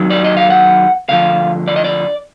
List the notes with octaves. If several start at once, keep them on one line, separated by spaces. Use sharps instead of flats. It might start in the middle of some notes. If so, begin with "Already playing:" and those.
Already playing: D#2 D#3 F#3
D5
D#5
F5
F#5
D2 D3 F3 F5
D5
D#5
D5